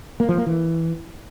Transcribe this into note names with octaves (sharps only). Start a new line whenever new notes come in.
A#3
F3
A#3
E3